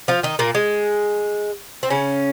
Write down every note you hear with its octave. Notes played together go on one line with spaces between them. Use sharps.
F3 F4
D#3 D#4
A#2 A#3
G#3
C4
C#3 C#4